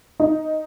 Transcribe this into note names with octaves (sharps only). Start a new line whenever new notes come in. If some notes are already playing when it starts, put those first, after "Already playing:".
D#4